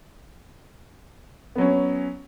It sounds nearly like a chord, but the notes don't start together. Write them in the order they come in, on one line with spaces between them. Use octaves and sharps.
B3 F#3 C#4